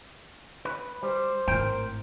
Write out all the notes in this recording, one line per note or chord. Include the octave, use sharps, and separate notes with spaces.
B4
G3 C5
G#1 A2 A#4 G5